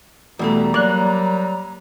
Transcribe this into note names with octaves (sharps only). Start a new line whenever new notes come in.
E2 B2 G3 A3 A#5
F#3 A#3 D5 F#6